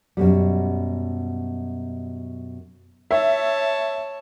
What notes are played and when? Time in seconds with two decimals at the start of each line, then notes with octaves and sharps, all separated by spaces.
0.17 F#2 B2 G3
3.11 C#5 E5 A5